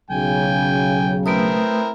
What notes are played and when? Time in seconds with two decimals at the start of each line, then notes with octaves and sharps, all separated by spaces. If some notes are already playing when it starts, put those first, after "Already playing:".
0.10 B1 C#3 F#3 G5 G#5
1.26 A3 C4 E4 A#4 B4 D#6